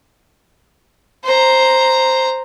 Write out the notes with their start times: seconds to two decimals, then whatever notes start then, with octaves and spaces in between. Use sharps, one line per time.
1.24 C5 A#5